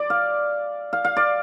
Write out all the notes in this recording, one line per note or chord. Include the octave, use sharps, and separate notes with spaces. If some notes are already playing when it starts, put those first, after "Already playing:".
Already playing: D5
F5
F5
F5
D5